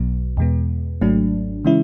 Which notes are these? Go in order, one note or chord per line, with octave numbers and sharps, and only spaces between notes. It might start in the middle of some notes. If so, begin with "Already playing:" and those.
Already playing: B1 B2 F#3 B3
E2 B2 G#3 B3
G#1 G#2 F#3 A3 D4
C#3 E3 G#3 C#4 E4